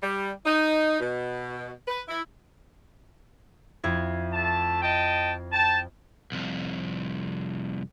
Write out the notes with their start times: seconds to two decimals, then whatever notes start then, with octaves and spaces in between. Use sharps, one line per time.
0.02 G3
0.46 D#4
1.00 B2
1.88 B4
2.08 E4
3.84 F2 E4 G#6
4.33 A3 A5
4.82 D#5 G5 A5
5.52 G5 A5
6.32 C2 F2